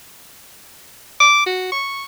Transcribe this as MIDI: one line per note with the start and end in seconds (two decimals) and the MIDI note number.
1.20 1.42 86
1.46 1.69 66
1.72 2.04 85